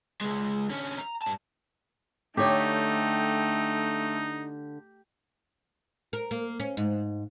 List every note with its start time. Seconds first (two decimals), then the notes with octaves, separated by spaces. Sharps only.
0.21 C#2 G#3
0.69 D3 C#4
0.98 A#5
1.22 G2 A5
2.37 D3 A3 D#4 G4 C#5
6.13 A#4
6.31 A#3
6.60 C#4
6.77 G#2